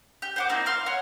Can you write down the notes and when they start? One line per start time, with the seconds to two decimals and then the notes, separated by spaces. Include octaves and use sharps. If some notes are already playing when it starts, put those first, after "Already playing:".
0.22 G4
0.36 C5 F#5 D6
0.49 A#3 C4 D#4 E4
0.66 F5 C6 F6
0.86 C#5 F#5